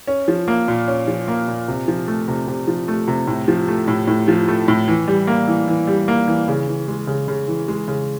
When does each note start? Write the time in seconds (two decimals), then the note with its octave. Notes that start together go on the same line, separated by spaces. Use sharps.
0.07 C#4
0.28 F3
0.48 A#3
0.68 A#2
0.88 C#4
1.08 F3
1.28 A#3
1.48 A#2
1.68 C3
1.88 F3
2.08 A3
2.28 C3
2.47 C3
2.68 F3
2.88 A3
3.08 C3
3.27 A2
3.48 F3
3.68 A3
3.88 A2
4.07 A2
4.28 F3
4.48 A3
4.68 A2
4.88 E3
5.08 G3
5.27 A#3
5.47 E3
5.68 E3
5.87 G3
6.08 A#3
6.28 E3
6.48 C#3
6.68 E3
6.88 G#3
7.07 C#3
7.28 C#3
7.48 E3
7.68 G#3
7.88 C#3